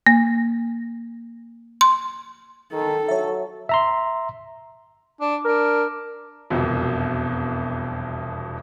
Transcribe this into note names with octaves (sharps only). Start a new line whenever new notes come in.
A#3
C6
D#3 A4
F#3 C#5 E5
E5 A#5 C6
D4
D4 A#4
E1 C2 F2 B2